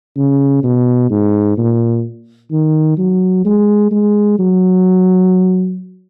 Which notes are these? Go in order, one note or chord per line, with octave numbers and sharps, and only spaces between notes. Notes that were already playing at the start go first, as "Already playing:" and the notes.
C#3
B2
G#2
A#2
D#3
F#3
G#3
G#3
F#3